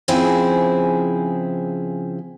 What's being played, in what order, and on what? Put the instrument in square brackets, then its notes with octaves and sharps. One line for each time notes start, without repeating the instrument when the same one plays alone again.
[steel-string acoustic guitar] C#3 F3 C4 E4 G#4